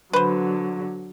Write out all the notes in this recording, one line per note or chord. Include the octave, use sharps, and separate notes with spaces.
D3 F#3 B4 C5